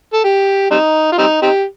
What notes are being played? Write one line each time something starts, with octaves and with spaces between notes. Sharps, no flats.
A4
G4
G3 C4 D#4
F4
G3 C4 D#4
C4 D#4 G4